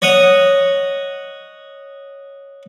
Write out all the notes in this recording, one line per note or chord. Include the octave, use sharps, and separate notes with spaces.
C#5 D#5 F#5 D#6